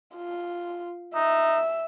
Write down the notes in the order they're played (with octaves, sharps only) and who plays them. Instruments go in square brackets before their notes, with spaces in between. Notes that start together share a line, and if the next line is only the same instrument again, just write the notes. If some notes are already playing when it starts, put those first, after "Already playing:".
[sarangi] F4
[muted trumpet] D#4 [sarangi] E5